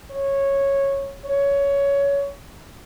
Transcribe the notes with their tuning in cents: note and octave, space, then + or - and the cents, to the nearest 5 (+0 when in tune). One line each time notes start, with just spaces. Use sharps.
C#5 -10
C#5 +15